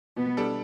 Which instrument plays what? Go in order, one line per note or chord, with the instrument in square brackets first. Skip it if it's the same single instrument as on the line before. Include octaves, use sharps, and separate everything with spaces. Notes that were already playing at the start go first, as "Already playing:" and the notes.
[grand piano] B2 [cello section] B3
[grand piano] G3 D4 A4